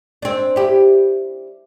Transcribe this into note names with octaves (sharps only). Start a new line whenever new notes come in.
C4 D4
E4 G4